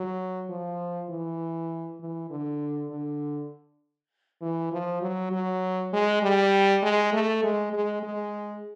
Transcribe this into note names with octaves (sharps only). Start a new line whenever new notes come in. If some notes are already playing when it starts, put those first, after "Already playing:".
Already playing: F#3
F3
E3
E3
D3
D3
E3
F3
F#3
F#3
G#3
G3
G#3
A3
G#3
G#3
G#3